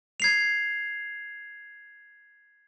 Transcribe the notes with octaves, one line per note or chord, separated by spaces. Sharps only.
G#6 C7 F7